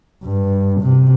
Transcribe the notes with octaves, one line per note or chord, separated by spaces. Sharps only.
G2
C3